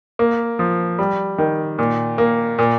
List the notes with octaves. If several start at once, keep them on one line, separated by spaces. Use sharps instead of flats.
A#3
F3
G3
D#3
A#2
A#3
A#2